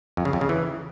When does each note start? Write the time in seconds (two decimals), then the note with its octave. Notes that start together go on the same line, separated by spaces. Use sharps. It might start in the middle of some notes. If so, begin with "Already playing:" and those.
0.17 F2
0.25 C#3
0.33 F2
0.41 C#3
0.49 E3